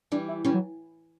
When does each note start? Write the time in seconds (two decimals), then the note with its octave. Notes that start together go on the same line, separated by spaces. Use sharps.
0.12 E3 G3 D4
0.28 E4
0.45 E3 G3 C#4
0.54 F#3